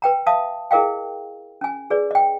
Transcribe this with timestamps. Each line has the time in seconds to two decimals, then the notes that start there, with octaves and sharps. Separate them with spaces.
0.02 B4 G5 A#5
0.26 E5 F5 A5 D#6
0.71 E4 G#4 A#4 D#5 F5 G5
1.61 C#4 G#5
1.90 G#4 B4 D5
2.11 D#5 G5